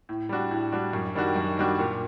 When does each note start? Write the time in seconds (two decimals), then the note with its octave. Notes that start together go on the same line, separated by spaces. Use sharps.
0.09 A2
0.29 G3 D4 F#4
0.51 A2
0.72 G3 D4 F#4
0.93 F#2
1.15 D#3 G3 D4 F#4
1.36 F#2
1.58 D#3 G3 D4 F#4
1.79 A#2